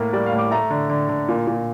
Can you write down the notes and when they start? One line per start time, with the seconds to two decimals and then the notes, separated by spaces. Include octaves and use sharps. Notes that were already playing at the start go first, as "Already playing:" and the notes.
Already playing: A2 A3 A#3
0.13 G3 D5
0.26 F5
0.32 A2
0.39 D6
0.51 A3 A#5
0.70 D3
0.90 D3
1.09 D3
1.29 A#2
1.47 A#2